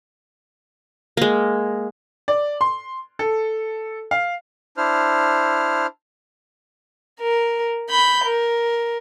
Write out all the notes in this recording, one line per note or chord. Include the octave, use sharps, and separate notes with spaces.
G#3 A#3
D5
C6
A4
F5
D4 E4 C5 F6
A#4
B5 G6
A#4